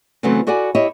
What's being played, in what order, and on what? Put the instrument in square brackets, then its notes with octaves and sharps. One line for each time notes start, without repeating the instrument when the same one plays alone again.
[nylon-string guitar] C#3 E3 F#3 A3 B3 C4
E4 F#4 A4 D5 F#5 G#5
E4 G4 C#5 D#5 E5